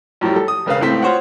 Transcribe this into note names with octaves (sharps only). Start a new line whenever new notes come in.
F#2 A2 F3 G3
A4
D#6
E1 C#3 B4 F5
C#2 A2 A3 C4 B6
F4 F#4 C5 C#5 F#5